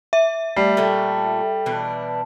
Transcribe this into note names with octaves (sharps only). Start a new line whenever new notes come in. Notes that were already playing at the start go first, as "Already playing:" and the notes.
E5
G3 A3
A#2 A3 A4 F#5 G5
B2 E3 D4